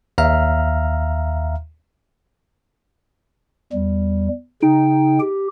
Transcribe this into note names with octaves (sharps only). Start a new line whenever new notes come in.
D#2 E5 F5 A#5 F6
E2 G3
C#3 D#4 G5
G4